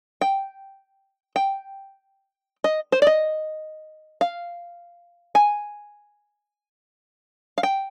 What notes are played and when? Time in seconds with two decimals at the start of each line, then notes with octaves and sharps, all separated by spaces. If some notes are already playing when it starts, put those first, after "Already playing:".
0.21 G5
1.36 G5
2.64 D#5
2.92 C5
3.02 D5
3.07 D#5
4.21 F5
5.35 G#5
7.58 F5
7.63 G5